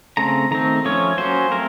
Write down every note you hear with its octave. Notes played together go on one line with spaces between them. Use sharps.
C#3 A3 C4 A#5
D#3 A3 C4 A#5
F3 A3 C#4 C#5
F#3 A#3 C#4 C5
A3 C4 A#4